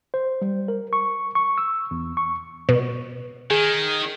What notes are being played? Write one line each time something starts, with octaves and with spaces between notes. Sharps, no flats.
C5
G3
A#4
C#6
C#6
E6
E2
C#6
B2
D#3 G#4